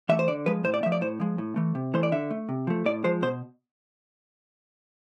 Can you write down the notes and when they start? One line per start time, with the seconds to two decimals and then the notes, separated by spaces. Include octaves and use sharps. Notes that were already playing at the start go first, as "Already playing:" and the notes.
0.09 E3 A3 E5
0.19 C5
0.27 D3 D5
0.46 F3 G#3 B4
0.64 A2 C5
0.74 D5
0.83 A3 E5
0.86 F3
0.92 D5
1.01 A2 C5
1.20 F3 G#3
1.38 A2
1.56 E3 A3
1.75 C3
1.94 E3 A3 C5
2.03 D5
2.12 D3 E5
2.31 A3
2.49 C3
2.67 F3 A3
2.86 A2 D5
3.04 F3 G#3 C5
3.22 B2 C5